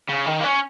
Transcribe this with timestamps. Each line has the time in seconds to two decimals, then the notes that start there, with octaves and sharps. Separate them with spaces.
0.09 C#3
0.26 D#3
0.41 A#3
0.44 C#4